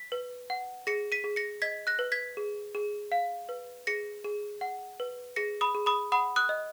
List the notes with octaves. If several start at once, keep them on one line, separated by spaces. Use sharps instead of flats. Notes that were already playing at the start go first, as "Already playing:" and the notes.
Already playing: B6
B4
F#5
G#4 A#6 C#7
B6 D#7
G#4
A#6 C#7
D#5 G#6 B6
F#6 A#6
B4
G#6 B6
G#4
G#4
F5
B4
G#4 A#6 C#7
G#4
F#5
B4
G#4 A#6 C#7
B5 D#6
G#4
B5 D#6
F#5 B5 D#6
D#6 F#6
D#5